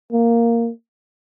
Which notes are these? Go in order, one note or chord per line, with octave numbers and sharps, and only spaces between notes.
A#3